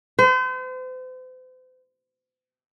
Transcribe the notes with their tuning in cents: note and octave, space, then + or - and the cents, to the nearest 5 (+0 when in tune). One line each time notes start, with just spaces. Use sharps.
C5 -40